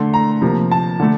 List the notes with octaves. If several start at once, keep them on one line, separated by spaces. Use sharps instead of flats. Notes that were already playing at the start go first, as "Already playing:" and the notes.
Already playing: D3 A3 C6
A#5
C3 F3 A#3
A5
D3 A3